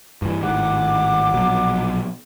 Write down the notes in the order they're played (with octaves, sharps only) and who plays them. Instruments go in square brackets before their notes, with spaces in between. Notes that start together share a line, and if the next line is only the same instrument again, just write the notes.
[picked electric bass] G2 E3
[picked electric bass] G#1 A2 D#3 [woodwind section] F#5 D6
[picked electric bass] A#1 B2 F#3